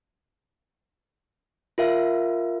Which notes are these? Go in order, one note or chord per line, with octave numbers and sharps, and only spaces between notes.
F4 A#4 E5 F5